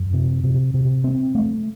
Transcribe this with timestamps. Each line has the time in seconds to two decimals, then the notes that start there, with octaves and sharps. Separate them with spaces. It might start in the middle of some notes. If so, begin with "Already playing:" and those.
Already playing: F#2 F#3
0.13 C3
0.44 C3
0.74 C3
1.04 C4
1.35 A3